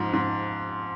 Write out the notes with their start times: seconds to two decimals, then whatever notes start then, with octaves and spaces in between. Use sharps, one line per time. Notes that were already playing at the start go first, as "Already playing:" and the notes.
Already playing: G#2 F3
0.13 G#2